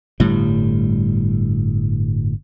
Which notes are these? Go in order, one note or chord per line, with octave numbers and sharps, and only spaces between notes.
G1 A2 G3